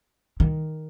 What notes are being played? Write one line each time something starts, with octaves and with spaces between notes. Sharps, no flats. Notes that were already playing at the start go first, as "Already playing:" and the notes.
D#3